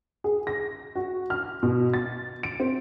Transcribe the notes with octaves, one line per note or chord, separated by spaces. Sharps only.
G#4
A#6
F#4
F6
B2
A6
D7
C4